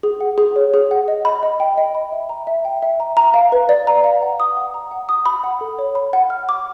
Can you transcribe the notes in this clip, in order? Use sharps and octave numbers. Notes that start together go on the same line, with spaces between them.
G#4
F#5
G#4
C#5
G#4
F#5
D#5
B5
D#5
G5
D#5
B5
E5
A#5
E5
G5
E5
A#5
A#5
F5
B4
D5
A#5
F5
F#5
D#6
F#5
A#5
F#5
D#6
B5
F#5
A4
C#5
B5
F#5
F6
D6